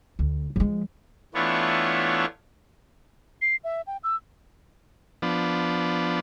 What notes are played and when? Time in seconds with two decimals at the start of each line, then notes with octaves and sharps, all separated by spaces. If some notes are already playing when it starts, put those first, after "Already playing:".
0.19 D2
0.56 F3 G#3
1.34 E3 A3 B3 D4 F4 C#5
3.42 C7
3.64 E5
3.87 G5
4.04 E6
5.22 F3 B3 D4